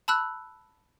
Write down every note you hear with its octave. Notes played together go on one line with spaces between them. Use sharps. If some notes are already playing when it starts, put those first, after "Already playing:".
A5 B5 E6 F#6